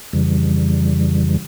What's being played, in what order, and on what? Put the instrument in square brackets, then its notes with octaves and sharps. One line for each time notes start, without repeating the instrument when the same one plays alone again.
[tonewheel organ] F2 C#3 E3 G3